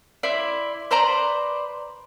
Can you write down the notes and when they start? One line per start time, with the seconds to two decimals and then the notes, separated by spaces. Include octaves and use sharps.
0.23 E4 D5 C6
0.91 B4 C5 D5 A#5